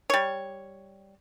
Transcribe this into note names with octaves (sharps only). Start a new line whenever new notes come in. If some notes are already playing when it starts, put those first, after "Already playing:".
G3 C#5